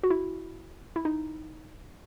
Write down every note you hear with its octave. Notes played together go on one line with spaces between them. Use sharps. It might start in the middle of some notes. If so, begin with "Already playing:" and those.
F#4
E4
E4
D#4